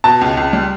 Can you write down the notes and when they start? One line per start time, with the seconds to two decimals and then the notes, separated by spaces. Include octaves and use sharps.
0.04 B2 A5
0.21 C#2
0.37 C#2
0.53 G3